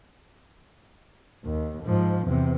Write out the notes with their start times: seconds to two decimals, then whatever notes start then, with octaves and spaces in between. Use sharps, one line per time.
1.44 D#2
1.84 G#2 F3
2.27 E2 C3